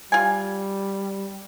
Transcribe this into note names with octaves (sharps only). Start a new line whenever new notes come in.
G3 F4 G#5